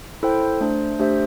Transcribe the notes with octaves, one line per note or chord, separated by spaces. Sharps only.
E4 A4 C5 G5
A3 D4 C5
A3 D4 G4 C5 E5